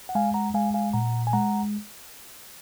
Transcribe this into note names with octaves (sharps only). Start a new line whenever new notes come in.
F#5
G#3 F5 G#5
F#5 A#5
G#3 F5 G#5
F5 G#5
A#2 F#5 A#5
G#5
G#3 F#5 A#5